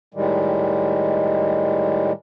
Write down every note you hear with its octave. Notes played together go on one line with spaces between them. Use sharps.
A2 D#3 G3 G#3